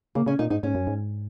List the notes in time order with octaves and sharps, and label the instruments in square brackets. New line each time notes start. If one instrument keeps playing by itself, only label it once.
[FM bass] C#3 [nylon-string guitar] A#3
[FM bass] C#3 [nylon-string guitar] C#4
[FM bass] A#2 [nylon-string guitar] D#4
[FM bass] G#2 [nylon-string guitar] D#4
[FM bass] G#2 [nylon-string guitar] C#4
[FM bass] F#2
G#2